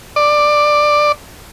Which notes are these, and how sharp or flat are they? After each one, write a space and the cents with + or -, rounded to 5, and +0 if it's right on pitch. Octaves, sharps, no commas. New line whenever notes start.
D5 +10